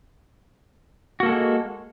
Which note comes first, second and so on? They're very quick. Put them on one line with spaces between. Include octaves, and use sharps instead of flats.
F#4 A#3 A4 G#3